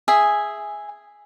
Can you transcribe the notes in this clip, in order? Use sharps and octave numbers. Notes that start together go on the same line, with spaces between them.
G#4 E5 G#5